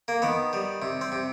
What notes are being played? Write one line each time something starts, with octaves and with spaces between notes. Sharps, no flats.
A#3
D#3 B3
G3
C3
C4
C3